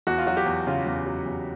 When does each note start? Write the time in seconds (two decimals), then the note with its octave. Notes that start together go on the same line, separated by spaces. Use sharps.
0.07 E2 F#4
0.18 F4
0.26 F#3 F#4
0.37 G4
0.46 E2
0.67 C#3 F4
0.86 E2
1.06 F#3
1.26 E2